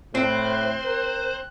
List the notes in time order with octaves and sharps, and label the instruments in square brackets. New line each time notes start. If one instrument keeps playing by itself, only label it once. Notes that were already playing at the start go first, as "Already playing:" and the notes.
[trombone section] A2 [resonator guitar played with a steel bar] C4 [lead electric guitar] C5 [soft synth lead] F#6
[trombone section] A#4